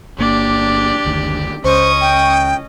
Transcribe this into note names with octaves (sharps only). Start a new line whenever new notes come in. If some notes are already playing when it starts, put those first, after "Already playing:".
G1 A#3 D4 G4 D5
F#1 D2 D#3
C#2 C#4 C5 D#5 C#6 D#6
G5